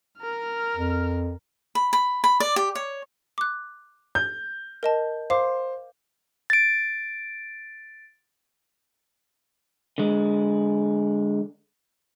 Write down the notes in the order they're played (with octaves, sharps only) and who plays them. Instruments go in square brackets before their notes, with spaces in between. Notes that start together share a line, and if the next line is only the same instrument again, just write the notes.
[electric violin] A#4 F6
[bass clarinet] F2
[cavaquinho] B5
B5
B5
D5
G4
C#5
[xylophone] D6 F#6
[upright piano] G6
[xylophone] A#4 D#5 A5
[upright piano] C5 [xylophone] F5 D6
[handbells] A6 D7
[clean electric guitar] D3 G#3